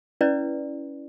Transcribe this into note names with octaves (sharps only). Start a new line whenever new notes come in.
C#4 E4 B4 D5